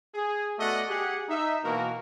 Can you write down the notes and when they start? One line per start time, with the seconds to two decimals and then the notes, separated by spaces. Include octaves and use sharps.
0.15 G#4
0.59 A3 B3 F#4 D5 D#5 F#5
0.89 G4 G#4 F#5
1.29 D#4 E5
1.65 B2 E3 A#3 F#4 A#4